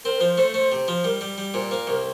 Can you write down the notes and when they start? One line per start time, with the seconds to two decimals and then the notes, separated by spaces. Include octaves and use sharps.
0.05 C4 A#4
0.17 A#4
0.21 F3 C5
0.38 A3 C5
0.54 A3 C5
0.72 C3
0.88 F3
1.04 G3 A#4
1.21 G3
1.38 G3
1.54 A#2 C5
1.71 A#3 C5
1.87 C2 A#4